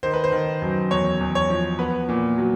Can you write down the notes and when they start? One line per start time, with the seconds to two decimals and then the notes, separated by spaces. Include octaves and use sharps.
0.03 D#3 C5
0.14 B4
0.24 C5
0.32 D#3
0.62 F#2
0.91 E2 C#5
1.20 E2
1.35 C#5
1.50 F3
1.79 B3 B4
2.09 A#2
2.38 F#3